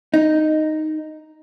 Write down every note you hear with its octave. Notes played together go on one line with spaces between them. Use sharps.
D#4